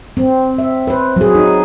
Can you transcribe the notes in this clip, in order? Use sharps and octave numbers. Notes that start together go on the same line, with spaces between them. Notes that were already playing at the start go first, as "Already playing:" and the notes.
C4
E5
B4 C5
F#3 G#4
D#4